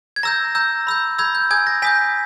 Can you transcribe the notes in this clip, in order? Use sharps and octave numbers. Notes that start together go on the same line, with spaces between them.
G#6
A#5 E6 G6 A#6
A#5 E6 G6
B5 E6 G6
B5 E6 G6 G#6
G6
G#5 D#6 G6 G#6
A#6
G#5 D#6 G6 B6